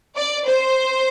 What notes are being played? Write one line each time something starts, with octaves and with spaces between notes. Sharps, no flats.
D5
C5